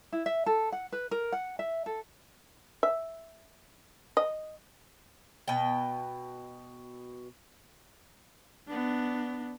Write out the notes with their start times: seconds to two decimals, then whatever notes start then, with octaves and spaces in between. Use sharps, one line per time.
0.12 E4
0.26 E5
0.46 A4
0.72 F#5
0.92 B4
1.11 A#4
1.32 F#5
1.59 E5
1.86 A4
2.83 E5
4.17 D#5
5.48 B2 G5
8.68 B3 D4